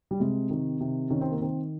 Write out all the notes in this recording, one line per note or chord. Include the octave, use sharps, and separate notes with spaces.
G3
C3 G#3
D#3
C3
D#3 C#4
C4
A#3
D#3 C4